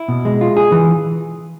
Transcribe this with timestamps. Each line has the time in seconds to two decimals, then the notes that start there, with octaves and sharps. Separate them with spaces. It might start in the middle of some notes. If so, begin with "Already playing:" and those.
Already playing: E4
0.08 B2
0.25 G#3
0.41 F4
0.57 G#4
0.72 E3